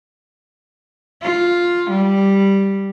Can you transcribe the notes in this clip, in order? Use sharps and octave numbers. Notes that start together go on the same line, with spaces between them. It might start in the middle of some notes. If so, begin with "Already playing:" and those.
F4
G3